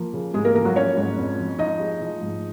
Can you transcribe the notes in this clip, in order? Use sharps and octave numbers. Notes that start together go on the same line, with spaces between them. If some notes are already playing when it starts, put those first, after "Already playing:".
Already playing: F3 A#3
C#3
G#2 G#3 G#4
A#3 A#4
F3 A#3 A#4
F#3 F#4
A#3 C#4 C#5
G#2
F2
F3
F3 D#4 D#5
G#3
F3
G#2